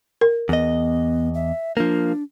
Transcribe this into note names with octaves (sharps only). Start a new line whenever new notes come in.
A#4
E2 B3 D#5
E5
F3 A#3 D4